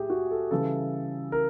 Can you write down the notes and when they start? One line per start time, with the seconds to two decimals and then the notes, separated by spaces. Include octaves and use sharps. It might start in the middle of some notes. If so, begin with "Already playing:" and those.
Already playing: A2 G4 G#4
0.10 F#4
0.31 A4
0.51 C#3 E3 G3 A4
1.32 A#4